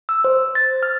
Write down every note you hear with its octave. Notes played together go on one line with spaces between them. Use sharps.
E6
C5
A6
F6